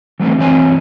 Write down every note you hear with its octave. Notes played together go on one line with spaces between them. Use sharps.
E3 F#3 A3 B3 C4
F#2 E3 C4 C#5 G#5 C6